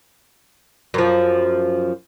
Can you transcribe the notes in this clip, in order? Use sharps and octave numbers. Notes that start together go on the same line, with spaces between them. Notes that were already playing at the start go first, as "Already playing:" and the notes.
F#2 F3